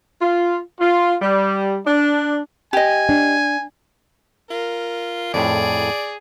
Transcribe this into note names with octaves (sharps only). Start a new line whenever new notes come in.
F4
F4
G3
D4
G4 D#5 G#5
D4
F4 A#4
F2 A2 G#4 D5